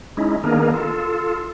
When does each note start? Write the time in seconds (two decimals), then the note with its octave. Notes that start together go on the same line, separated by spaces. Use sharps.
0.17 G#3 C#4 D#4 E4
0.44 D#3 A#3 B3 D4 G#4 A#4
0.74 F4 A4